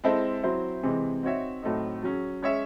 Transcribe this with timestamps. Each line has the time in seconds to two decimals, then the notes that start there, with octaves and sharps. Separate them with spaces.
0.04 G#3 C4 E4 A4 C5
0.43 F#3 C4 E4 C5
0.83 C3 E3 G#3 C4
1.23 C4 D#4 F#4 C#5 E5
1.62 A2 F#3 A3 C4 D#4
2.03 F#3 C#4 G#4
2.42 G#3 C#4 G#4 C#5 E5